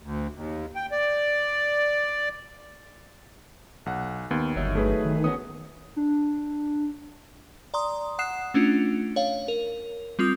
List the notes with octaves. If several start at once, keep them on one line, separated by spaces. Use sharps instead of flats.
D2
D#2
G5
D5
B1 F#5
D#2 B3
G1 F#3 D#4 E5
A3 G#4 B4
D#3
B3 C#4 F#4 D#6
D4
D5 A#5 C6 D#6
F#5 D#6 F#6 C7 E7
A3 C#4 D4 F4
C#5 F5
A#4
G3 C4 F4 D#6